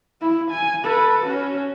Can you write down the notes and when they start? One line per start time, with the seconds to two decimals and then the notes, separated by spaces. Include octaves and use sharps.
0.21 E4
0.51 G#5
0.84 A4 B4
1.27 C#4 F#4